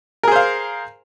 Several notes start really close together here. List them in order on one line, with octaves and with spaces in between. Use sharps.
A#4 G#4 C5 F5